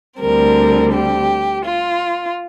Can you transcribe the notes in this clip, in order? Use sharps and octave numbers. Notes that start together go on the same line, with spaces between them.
D2 D3 G3 C4 A#4
G4
F4